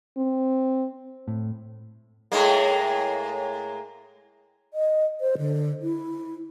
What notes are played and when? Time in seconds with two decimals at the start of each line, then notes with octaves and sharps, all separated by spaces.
0.17 C4
1.28 A2
2.32 A2 G#3 A#3
4.74 D#5
5.21 C5
5.38 D3
5.82 E4